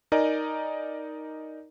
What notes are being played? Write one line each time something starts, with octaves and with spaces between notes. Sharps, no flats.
D#4 A#4 D5 D#5 G#5 A#5